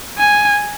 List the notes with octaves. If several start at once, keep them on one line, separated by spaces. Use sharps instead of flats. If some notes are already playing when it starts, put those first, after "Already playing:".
G#5